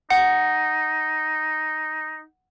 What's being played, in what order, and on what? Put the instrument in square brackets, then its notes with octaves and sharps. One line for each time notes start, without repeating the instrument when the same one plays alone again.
[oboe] D#4 [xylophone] F#5